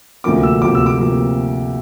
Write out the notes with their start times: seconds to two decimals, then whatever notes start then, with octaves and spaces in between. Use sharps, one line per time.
0.24 D2 C3 F3 A#3 D6
0.43 E6
0.62 D2 C3 F3 A#3 D6
0.75 E6
0.86 D6
1.00 C3 F3 A#3